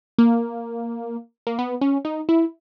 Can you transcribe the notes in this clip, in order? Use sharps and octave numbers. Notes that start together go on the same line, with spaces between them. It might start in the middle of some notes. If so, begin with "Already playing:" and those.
A#3
A#3
B3
C#4
D#4
E4